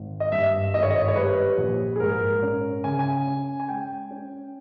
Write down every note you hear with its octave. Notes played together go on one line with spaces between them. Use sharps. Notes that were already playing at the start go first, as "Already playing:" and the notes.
Already playing: G#1
D#5
G2 E5
G#1 D#5
C#5
D#5
C#5
G3 B4
A#1
G#4
G#2 A#4
C#4
C#3 G#5
G#5
C#4
G#5
G#3 G5
C#4